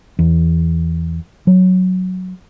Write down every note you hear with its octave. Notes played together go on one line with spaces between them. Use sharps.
E2
F#3